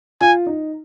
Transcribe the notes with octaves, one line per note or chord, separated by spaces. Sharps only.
F4 G#5
D#4